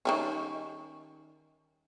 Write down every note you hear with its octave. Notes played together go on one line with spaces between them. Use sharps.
D#3 G3 C#4